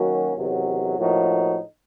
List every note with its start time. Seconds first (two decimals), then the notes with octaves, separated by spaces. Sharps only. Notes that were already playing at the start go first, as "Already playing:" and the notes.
Already playing: D#3 F#3 A#3 C#4 F#4
0.36 E2 C3 D#3 F#3
0.97 A2 F3 A#3 D#4 F#4